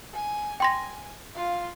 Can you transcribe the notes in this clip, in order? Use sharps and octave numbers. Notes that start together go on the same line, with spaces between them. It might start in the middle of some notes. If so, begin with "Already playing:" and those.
G#5
G5 G#5 C6 A#6
F4 F5